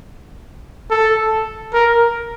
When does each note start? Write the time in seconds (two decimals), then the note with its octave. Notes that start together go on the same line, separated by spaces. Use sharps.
0.91 A4
1.73 A#4